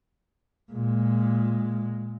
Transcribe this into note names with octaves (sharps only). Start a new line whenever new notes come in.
A#2 G#3